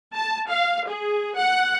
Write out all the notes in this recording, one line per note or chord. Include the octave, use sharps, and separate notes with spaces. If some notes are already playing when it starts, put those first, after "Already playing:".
A5
F5
G#4
F#5